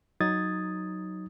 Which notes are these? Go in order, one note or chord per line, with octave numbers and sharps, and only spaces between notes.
F#3 D#4 D#6 G#6 A6